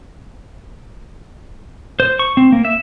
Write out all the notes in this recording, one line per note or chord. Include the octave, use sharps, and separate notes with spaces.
C5
C#6
C4
A#3
E5